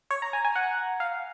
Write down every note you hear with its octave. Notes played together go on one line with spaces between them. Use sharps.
C#5
A#5
G#5
G#5
F#5
F5